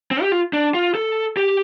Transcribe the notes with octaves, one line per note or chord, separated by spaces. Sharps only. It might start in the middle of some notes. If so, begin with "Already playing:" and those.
C4
G4
F4
D4
F4
A4
G4